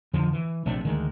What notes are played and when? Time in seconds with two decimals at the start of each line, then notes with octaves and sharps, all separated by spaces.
0.13 F2 D3 F3
0.33 E3
0.66 A#1 C3 A3 D4
0.85 D2 D#3 G#3